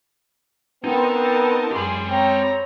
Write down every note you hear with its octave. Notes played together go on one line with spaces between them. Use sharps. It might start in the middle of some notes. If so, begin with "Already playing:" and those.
B3 C4 D#4 A#4 A5
F#2 G4 G#4 B5 C6
C4 C#5 A#5